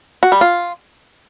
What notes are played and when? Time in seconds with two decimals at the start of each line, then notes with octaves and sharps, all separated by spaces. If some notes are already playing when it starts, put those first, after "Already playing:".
0.23 F#4
0.32 G3
0.41 F4